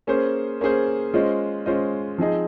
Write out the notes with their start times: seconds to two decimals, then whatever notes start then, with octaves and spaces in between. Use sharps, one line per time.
0.07 A#3 C#4 G#4 C5
0.61 A#3 C#4 G#4 C5
1.14 G#3 C#4 F4 C5 D#5
1.66 G#3 C#4 F4 C5 D#5
2.18 F3 C4 D#4 G#4 D#5